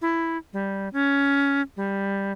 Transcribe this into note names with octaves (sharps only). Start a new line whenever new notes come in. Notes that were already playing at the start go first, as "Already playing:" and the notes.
E4
G3
C#4
G3